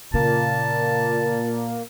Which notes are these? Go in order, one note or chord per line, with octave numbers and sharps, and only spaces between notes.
A#2 C#3 A#3 A5